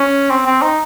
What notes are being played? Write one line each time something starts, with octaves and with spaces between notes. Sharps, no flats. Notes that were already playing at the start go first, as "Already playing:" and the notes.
Already playing: C#4
C4
C4
D#4